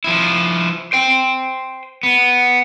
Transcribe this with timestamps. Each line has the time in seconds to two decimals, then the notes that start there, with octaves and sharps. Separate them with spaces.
0.04 F3 E4
0.93 C5 G5
2.03 B3